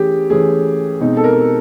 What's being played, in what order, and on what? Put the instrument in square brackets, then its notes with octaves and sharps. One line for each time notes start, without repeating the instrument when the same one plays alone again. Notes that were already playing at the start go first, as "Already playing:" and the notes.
Already playing: [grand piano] E3 A3 C#4 G4 G#4
E3 A3 C#4 G#4
B2 G#3 C4 D#4
A4
A#4